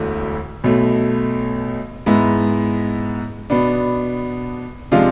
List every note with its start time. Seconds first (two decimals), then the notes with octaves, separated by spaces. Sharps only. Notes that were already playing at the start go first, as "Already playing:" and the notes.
Already playing: E1 D2 D3 A3 E4
0.64 B1 B2 A3
2.06 G#2 G#3 B3 E4
3.50 B2 B3 D4
4.92 C3 F3 G#3 D4 F4